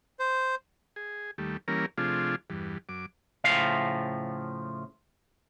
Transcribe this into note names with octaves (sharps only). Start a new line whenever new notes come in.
C5
G#4
D#2 G3 A3
E3 G3 A#3 C#4 A#4
C3 F3 A3 D4 F4 G#4
E2 G2
F#2 D6
A2 C#3 F3 F5